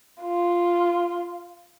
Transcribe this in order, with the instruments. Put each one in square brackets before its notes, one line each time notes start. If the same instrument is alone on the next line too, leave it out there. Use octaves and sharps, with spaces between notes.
[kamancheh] F4